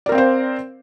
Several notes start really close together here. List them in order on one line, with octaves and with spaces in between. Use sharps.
D5 A#4 C4 F5 C5